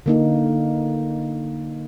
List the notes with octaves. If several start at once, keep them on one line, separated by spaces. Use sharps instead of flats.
D3 A#3 D#4